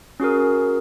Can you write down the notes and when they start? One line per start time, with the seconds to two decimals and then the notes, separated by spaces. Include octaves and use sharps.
0.20 C#4 F#4 G#4 A#4